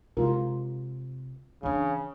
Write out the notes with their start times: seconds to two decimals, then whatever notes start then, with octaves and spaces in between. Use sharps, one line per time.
0.17 C3 G#3 F4 A#4
1.63 C#3 E3 D4